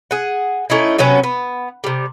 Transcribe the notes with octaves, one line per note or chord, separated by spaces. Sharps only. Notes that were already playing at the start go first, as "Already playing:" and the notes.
G#4 F#5
A3 C#4 D#4 E4
C3 F#3 B3 C#4
B3
C3 G3